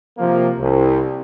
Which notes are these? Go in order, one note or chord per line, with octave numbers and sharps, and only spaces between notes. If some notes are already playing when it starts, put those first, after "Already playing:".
C3 F3 A#3
C2